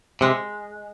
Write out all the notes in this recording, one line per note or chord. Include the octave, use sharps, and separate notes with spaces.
C3 G#3